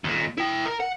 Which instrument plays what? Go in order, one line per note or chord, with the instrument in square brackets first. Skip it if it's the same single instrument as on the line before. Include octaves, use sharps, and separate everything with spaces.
[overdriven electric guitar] D#2 A#2
E4 G5
A#4
F#5